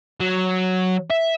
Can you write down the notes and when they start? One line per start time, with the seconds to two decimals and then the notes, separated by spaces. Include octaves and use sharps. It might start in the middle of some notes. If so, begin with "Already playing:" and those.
0.20 F#3
1.10 E5